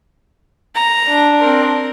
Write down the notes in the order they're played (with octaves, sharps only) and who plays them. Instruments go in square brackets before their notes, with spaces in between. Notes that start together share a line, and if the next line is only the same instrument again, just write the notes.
[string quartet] A#5
[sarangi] D4
[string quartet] C4 A#4